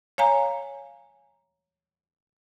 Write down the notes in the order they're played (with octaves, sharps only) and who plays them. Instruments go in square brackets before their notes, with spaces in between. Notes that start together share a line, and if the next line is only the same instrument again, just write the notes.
[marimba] C#5 F5 G#5 A#5